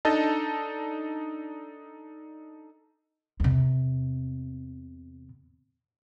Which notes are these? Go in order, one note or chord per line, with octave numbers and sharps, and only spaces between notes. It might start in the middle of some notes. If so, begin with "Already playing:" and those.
D4 D#4 A4 D#5 A5
E2 C3